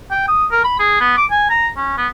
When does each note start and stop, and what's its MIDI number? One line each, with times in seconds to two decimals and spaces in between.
0.11 0.25 79
0.28 0.46 87
0.51 0.62 70
0.64 0.75 83
0.79 0.96 68
1.00 1.16 59
1.17 1.26 86
1.31 1.47 80
1.50 1.69 82
1.77 1.95 61
1.98 2.08 59